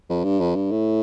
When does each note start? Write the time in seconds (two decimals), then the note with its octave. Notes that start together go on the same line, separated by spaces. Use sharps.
0.10 F2
0.24 G2
0.40 F2
0.56 G2
0.71 A2